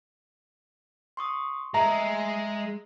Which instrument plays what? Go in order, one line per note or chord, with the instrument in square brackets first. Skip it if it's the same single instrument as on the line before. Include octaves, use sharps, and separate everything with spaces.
[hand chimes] C6 C#6 D#6
[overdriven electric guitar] G#3 [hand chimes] E5 [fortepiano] A#5